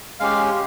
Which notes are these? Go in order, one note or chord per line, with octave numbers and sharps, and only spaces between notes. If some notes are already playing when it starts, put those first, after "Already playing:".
G#3 C#4 G4 F5